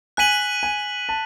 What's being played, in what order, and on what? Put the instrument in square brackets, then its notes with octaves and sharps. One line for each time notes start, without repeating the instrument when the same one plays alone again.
[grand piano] G#5 [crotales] F#6 B6 D#7 F#7
[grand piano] G#5
A5